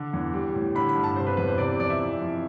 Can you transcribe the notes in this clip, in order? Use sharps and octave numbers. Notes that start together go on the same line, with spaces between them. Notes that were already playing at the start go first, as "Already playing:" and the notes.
Already playing: D3
E2
G3
A2
D3 B5
B5
G2
A5
C3 C5
B4
E2 B4
C5
C3 D5
D5
F2 D5
E5
E3
F2